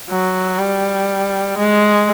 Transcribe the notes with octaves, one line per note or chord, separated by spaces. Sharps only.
F#3
G3
G#3